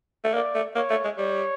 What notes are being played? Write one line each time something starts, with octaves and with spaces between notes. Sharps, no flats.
A3
A#3 D5
A3
A#3 C#5
A3
G#3
G3 C#5